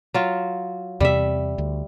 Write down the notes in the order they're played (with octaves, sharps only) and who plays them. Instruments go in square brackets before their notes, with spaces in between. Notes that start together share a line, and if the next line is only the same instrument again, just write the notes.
[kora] F#3 F4
[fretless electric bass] E2 C3 C4 [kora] G3 E5
[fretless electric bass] D2